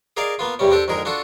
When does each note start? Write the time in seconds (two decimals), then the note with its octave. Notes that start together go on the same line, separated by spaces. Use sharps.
0.17 G#4 A#4 D5 D#5 F5 G#5
0.39 A#3 B3 F4
0.59 E2 G2 C3 G3 C#4
0.71 C4 D4 G4 A4
0.88 F2 G#2 D3 G#4 A#4
1.05 D4 F4 F#4 A4